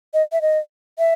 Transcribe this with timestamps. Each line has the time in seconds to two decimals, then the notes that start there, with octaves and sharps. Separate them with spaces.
0.14 D#5
0.32 E5
0.42 D#5
0.99 E5